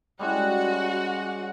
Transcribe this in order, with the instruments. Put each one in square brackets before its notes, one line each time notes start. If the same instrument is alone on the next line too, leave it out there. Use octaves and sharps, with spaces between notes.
[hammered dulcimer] G3 G#3 C#4 [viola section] F#4 F#5